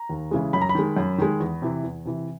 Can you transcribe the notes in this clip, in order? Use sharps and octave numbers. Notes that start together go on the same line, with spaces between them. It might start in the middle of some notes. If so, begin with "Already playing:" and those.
Already playing: A#5
D#2
C#3 E3 G#3
F#2 B5
A#5
B5
D#3 G#3
F#2
D#3 G#3
E2
C3 E3
E2
C3 E3